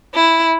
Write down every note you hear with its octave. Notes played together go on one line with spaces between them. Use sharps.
E4